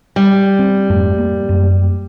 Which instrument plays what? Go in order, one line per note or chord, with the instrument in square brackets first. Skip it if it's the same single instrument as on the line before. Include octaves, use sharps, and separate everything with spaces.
[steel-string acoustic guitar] G3
[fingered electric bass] C4
F2 G#2 A3
A#3
F#2